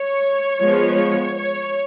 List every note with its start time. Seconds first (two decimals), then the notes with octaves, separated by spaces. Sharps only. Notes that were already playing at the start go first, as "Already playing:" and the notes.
Already playing: C#5
0.61 F3 G#3 B3
1.37 C#5